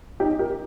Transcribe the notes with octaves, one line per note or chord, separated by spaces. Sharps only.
D#4 G4
G4 A#4